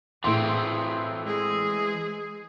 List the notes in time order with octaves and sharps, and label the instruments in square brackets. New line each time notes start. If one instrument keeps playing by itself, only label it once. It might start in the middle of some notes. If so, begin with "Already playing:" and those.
[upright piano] A2 E4 C6 [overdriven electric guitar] E3 C4 [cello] G#4
[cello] G#3 G#4